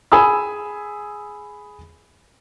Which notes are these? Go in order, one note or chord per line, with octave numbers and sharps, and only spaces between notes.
G#4 G#5 B5 D#6 E6